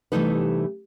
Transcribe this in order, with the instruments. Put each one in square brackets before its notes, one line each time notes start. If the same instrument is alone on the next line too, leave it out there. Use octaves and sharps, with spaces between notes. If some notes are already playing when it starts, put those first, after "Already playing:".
[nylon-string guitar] C3 E3 G3 A3 D#4 B4